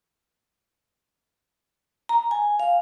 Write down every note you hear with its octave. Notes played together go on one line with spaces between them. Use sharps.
A#5
G#5
F5